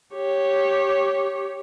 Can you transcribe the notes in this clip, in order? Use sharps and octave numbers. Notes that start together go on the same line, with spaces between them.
G4 C#5